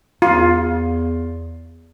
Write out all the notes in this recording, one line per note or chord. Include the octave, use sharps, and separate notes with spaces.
E2 F4